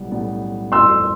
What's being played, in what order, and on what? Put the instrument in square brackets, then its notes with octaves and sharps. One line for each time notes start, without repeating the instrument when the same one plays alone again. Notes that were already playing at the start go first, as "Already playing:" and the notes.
Already playing: [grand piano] B1 A2 G3 B3
B1 A2 G3 B3
[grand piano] G1 F2 E3 A3 E4 [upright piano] C6 E6